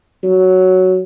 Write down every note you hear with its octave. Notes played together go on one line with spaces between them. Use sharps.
F#3